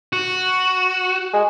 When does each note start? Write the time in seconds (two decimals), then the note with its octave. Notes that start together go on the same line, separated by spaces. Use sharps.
0.13 F#4
1.33 G#3